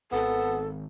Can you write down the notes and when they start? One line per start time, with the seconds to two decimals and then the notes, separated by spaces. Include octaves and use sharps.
0.12 G#1 B3 A4